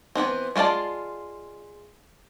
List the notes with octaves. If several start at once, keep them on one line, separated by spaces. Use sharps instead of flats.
E3 G3 B3 C4
G#3 A3 F4 D5 A5